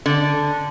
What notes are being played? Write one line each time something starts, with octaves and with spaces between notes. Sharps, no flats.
D3